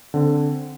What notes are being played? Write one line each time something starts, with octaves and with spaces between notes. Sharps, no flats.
D3 C4